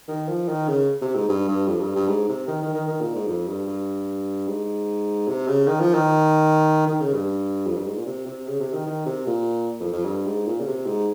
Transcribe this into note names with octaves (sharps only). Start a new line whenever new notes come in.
D#3
F3
D#3
C#3
C3
G#2
G2
G2
F2
G2
G2
G#2
C3
D#3
D#3
D#3
D#3
A#2
G#2
F2
G2
G2
G#2
C3
C#3
D#3
F3
D#3
D#3
C#3
G2
F2
G2
G#2
A#2
C3
C3
C#3
C3
D#3
D#3
C3
A#2
F2
F2
G2
G#2
A#2
C#3
C3
G#2